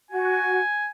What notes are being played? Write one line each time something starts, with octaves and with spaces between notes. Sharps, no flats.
F#4 G#5